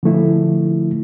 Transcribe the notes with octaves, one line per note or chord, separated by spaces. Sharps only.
D3 F3 A3 E4